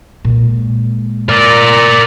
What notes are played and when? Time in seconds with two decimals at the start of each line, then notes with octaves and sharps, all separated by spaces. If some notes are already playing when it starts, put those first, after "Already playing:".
0.25 A#2 G#3
1.29 A#4 D5